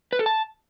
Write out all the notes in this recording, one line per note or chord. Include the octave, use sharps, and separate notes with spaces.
B4
A4
A5